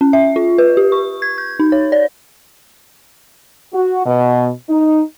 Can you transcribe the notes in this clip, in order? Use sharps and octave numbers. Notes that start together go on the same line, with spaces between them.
C#4
E5
F4
B4
G4
C#6
G#6
G6
D#4
C#5
D5
F#4
B2
D#4